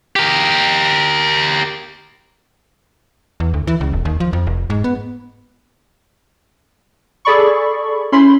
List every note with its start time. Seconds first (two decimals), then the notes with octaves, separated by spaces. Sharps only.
0.16 G4 A#4
3.40 E2
3.54 D2
3.67 E3
3.81 C#2
3.93 E1
4.05 D#2
4.20 F3
4.33 F2
4.47 F1
4.70 G#2
4.84 B3
7.25 G#4 A4 D5 B5 C#6
8.12 C#4 E4 B5 C6